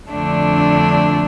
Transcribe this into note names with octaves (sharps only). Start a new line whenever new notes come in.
F2 D3 A3 D4